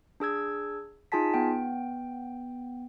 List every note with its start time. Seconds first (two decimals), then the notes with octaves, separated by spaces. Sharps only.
0.20 D4 G#4 E6 G#6
1.12 D#4 F4 G#4 G#5 A5 B6
1.34 B3 G5